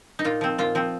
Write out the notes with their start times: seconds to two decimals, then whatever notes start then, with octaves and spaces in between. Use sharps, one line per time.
0.19 D#4
0.24 A#2 F4
0.41 F3 C4
0.58 A#2 F4
0.75 F3 C4